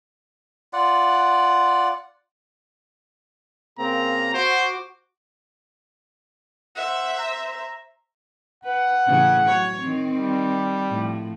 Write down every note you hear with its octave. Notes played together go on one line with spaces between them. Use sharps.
F4 D5 F#5
C#3 A#3 C4 A#5
F#4 C5 D6
C5 E5 F#5
A#5
B4 F#5
A2 C#3 E3
F#3 C#5
D#3 C4
G3
A2 F3